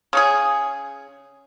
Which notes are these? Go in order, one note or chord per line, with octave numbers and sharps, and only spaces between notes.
C#3 C#4 G#4